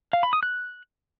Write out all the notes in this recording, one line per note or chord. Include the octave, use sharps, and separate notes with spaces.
F5
B5
D#6
F#6